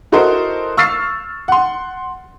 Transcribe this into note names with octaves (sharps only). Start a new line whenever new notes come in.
E4 F#4 A4 A#4 C5 D#5
C#6 E6 F6 A6 C7
F#5 C6